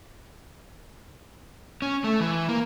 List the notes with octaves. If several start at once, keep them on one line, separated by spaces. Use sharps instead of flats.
C#4
A3
E3
A#3